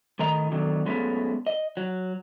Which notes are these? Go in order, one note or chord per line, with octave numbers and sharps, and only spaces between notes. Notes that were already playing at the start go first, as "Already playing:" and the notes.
A2 D#3 D#5 A#5
B2 D3 D#3 F#3
F#3 G#3 A3 B3 C#4
D#5
F#3